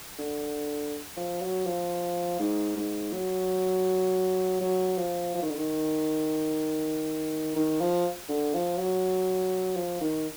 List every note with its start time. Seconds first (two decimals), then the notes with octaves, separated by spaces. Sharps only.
0.19 D3
1.17 F3
1.42 F#3
1.67 F3
2.40 G#2
2.77 G#2
3.14 F#3
4.61 F#3
4.98 F3
5.35 F3
5.42 D#3
5.49 D3
5.56 D#3
7.56 D#3
7.80 F3
8.29 D3
8.54 F3
8.78 F#3
9.77 F3
10.01 D#3